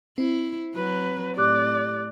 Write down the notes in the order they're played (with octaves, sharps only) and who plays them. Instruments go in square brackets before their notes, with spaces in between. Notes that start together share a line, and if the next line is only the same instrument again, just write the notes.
[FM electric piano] C4 [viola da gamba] E4
[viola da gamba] F#3 [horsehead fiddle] B4
[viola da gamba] A2 [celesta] G4 D6 F#6 [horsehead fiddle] D5